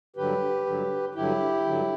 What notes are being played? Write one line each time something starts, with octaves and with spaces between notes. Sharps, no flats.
G2 D3 F#3 G4 B4
G2 D3 F#3
G2 D3 F#3 E4 G4
G2 D3 F#3